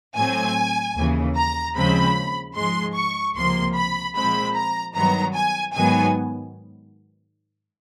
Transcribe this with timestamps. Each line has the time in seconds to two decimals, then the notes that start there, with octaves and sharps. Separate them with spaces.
0.17 A2 F#3 A3 C4 G#5
0.96 D#2 C#3 E3
1.36 A#5
1.76 D#2 C#3 F3 G#3 C4 B5
2.56 G#2 F3 G#3 C6
2.96 C#6
3.36 C#2 C3 F3 A#3 C6
3.75 B5
4.15 A#2 F3 G#3 C4 B5
4.56 A#5
4.94 G2 D#3 F#3 B3 A#5
5.35 G#5
5.75 G#2 D#3 F#3 B3 G#5